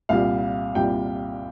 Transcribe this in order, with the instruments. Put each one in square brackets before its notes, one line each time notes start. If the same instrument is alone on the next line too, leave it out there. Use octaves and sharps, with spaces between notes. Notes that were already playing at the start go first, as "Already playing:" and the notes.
[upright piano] C2 A#2 G3 F5
C2 A#2 G3 G5